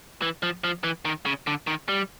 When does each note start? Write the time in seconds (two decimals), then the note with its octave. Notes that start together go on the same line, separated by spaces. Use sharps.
0.22 E3
0.43 F3
0.64 F3
0.84 E3
1.05 D#3
1.26 C#3
1.47 D3
1.67 D#3
1.89 G3